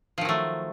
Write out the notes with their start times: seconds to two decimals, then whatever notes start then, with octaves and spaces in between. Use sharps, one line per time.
0.18 F3
0.21 D#3
0.25 F#3
0.29 A3